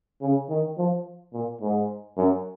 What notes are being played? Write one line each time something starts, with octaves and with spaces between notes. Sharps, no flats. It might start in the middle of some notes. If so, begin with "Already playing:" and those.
C#3
D#3
F3
A#2
G#2
F#2